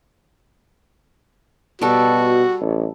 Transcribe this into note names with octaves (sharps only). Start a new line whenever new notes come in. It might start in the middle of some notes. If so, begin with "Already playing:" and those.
B2 G3 F#4 A4
A1